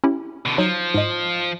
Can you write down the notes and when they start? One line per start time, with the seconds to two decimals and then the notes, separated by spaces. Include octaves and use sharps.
0.04 C#4 E4 G4
0.46 B2 D3
0.58 F3 F#3 D#4
0.94 G#2 D#5